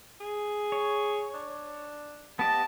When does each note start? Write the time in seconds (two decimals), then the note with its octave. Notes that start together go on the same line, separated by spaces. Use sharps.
0.20 G#4
0.72 C#5
1.34 D4
2.39 B3 G4 D#5 A5